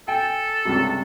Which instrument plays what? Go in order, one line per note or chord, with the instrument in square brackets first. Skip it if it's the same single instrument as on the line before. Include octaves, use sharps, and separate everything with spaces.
[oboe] A4 [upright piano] G5 G#5
[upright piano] C#2 G2 C3